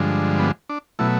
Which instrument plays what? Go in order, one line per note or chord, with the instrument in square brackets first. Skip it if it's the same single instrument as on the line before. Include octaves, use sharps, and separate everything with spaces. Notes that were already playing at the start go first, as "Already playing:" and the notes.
Already playing: [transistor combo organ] G2 D3 F3 G#3
B3
D4
B2 F#3 A3 E4